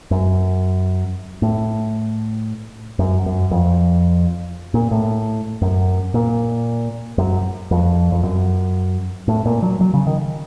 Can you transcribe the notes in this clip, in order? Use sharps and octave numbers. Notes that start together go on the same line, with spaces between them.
F#2
A2
F#2
F#2
F2
A#2
A2
F#2
A#2
F#2
F2
F2
F#2
A2
A#2
F#3
F#3
C#3
D#3